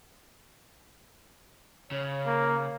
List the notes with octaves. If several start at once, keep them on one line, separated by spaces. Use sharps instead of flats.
C#3 C#5
A#3